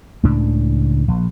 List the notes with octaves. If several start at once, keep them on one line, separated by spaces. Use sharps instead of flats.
C#2 A2 C#3 D4
A#1